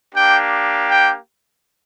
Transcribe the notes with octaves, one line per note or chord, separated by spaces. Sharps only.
A#3 D4 G4 G5
G5